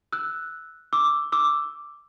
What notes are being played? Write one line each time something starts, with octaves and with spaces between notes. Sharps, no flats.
E6 F#6
D6 E6
D6 E6